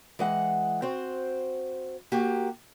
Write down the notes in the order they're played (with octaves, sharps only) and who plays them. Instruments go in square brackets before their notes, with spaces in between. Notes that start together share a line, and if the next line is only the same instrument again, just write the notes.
[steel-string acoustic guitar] E3 G#3 F#5
C4 F#4 C5
A#3 F#4 G4